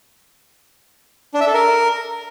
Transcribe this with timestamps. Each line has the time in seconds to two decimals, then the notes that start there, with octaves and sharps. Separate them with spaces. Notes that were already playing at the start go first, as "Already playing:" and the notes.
1.34 D4
1.41 E5
1.47 A4
1.54 A#4